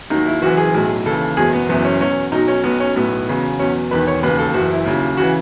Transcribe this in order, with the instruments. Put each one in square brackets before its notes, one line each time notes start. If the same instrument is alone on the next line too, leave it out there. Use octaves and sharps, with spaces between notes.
[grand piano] D#2 D#3 F#3 D#4
E4
F#1 F#2 E3 F#4
G#4
B1 A2 F#3
D#2 C#3 E3 A4
F#1 E2 B2 F#3 G#4
B3
F#1 F#2 E3 B3
C#4
E2 B2 F#3 C#4
B1 B2 F#3 D#4
C#4
B1 B2 F#3 B3
C#4
B1 A2 F#3 B3
E2 C#3 F#3
E2 B2 F#3 C#4
E1 E2 D#3 B4
C#5
E1 D#2 C#3 B4
A4
F#1 F#2 E3 F#4
E4
D#2 C#3 F#3
C#3 E3 F#4